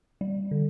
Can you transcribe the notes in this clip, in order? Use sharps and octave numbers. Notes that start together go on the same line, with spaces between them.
G3
D3